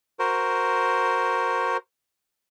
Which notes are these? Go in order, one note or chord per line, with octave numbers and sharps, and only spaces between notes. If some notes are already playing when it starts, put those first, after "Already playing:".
F#4 A#4 C5